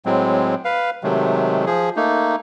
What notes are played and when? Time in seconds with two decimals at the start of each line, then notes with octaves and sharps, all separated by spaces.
0.06 A2 F#3 G#3 C4
0.65 B4 F5
1.03 C3 D#3 F#3 G#3 A3
1.66 F3 G#4
1.96 A3 A#3 D#4